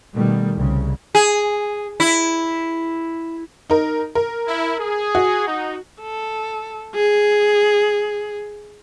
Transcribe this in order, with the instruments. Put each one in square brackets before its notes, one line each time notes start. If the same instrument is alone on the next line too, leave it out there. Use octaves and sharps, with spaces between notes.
[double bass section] B2 D#3 G3 A3
C2 C#3
[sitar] G#4
E4
[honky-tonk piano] D#4 A#4
A#4
[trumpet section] E4
G#4
[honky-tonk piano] F#4
[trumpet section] D#4
[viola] A4
G#4